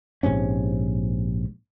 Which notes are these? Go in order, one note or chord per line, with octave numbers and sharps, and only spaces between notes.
A#1 G#2 C3 C#4